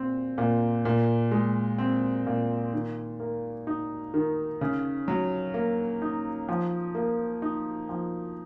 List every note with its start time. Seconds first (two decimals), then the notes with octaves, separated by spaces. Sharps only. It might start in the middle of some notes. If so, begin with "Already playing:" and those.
Already playing: A#2 C4
0.38 A#2
0.85 A#2
1.31 G#3
1.78 C4
2.27 A#2
2.73 D#3
3.20 A#3
3.67 D#4
4.14 D#3
4.61 C#3
5.08 F#3
5.54 A#3
6.02 D#4
6.49 F3
6.95 A#3
7.42 D#4
7.89 F3